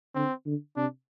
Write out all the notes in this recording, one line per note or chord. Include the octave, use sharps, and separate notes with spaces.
D3 C4
D3
C3 D4